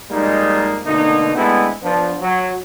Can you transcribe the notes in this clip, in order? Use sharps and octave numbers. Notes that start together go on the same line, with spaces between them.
F2 G3 G#3 A#3 D#4
B2 D3 A3 A#3 D#4
G#3 A3 B3 C4 D4 E4
F3 B3 D4
F#3